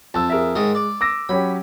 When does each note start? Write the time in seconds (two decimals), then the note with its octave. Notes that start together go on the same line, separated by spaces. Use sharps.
0.14 F2 A5 E6
0.30 G#4 A#4 E5
0.55 G#2 D#3 G#3 D#5
0.75 D5
1.01 D6 E6 A#6
1.29 F#3 C#4 G4 B5